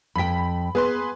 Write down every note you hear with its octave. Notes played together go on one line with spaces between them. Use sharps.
F2 G5 B5 B6
B3 G#4 B4 C6